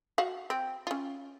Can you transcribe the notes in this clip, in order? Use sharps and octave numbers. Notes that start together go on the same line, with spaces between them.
F#4 F5
C4
C#4 F4